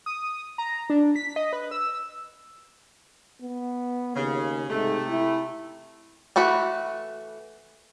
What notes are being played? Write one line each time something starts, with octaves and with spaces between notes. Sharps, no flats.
D#6
A#5
D4
B6
D#5
B4
E6
B3
D#2 C#3
G#2 C3 A3
E4
E3 A3 F#4 B5